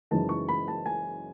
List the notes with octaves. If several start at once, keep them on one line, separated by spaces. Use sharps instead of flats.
F#1 F#2 E3 G#3 D#4 A5
C#6
B5
A5
G#5